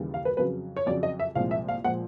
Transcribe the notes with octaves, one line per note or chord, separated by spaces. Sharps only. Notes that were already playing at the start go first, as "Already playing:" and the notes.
Already playing: D#2 C#3 E3 G3
F5
B4
F2 C#3 F#3 B4
C#5
F2 C#3 F#3 D5
D#5
E5
C2 A#2 F3 G#3 F5
E5
F5
A#2 F3 G#3 F#5